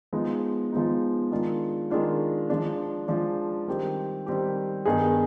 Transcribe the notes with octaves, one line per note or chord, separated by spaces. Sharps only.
F3 G#3 B3 D#4
F3 G#3 B3 D#4
D#3 G#3 D4 F4
D#3 G#3 D4 F4
F3 G#3 D4
F3 G#3 D4
D#3 G3 C4 G4
D#3 G3 C4 G4
G2 D#3 B3 D#4 G#4